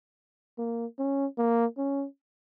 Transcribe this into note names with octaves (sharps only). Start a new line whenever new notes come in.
A#3
C#4
A#3
C#4